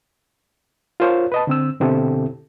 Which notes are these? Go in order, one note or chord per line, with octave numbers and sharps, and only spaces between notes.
F4 A#4 C5 C#5 F5
B4 D#5 A5
D3 C4 E6
B2 D3 C4 E4 G4 A4